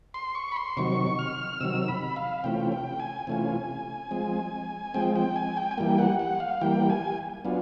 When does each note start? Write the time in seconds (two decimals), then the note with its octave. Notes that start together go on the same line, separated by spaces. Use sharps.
0.14 C6
0.35 C#6
0.52 B5
0.56 C6
0.77 C3 D#3 F#3 C#6
1.19 F6
1.61 C3 D#3 F#3 E6
1.88 B5
2.16 F5
2.44 C3 E3 A3 C#4 F4 G5
2.72 G5
3.00 G#5
3.27 C3 E3 A3 C#4 F4
4.11 F3 G#3 C4
4.94 F3 G#3 C4 G5
5.16 G5
5.36 G#5
5.57 G5
5.71 G#5
5.78 E3 G3 A#3 G5
5.98 F#5
6.19 F#5
6.40 F5
6.61 E3 G3 A#3 G5
6.90 G#5
7.45 F#3 B3 D4 F4